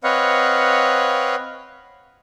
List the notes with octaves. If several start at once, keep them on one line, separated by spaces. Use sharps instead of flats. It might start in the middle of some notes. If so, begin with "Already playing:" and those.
C4 B4 C#5 D#5 F5 F#5